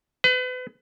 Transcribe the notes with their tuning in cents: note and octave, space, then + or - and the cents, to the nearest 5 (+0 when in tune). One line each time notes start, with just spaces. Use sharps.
B4 +35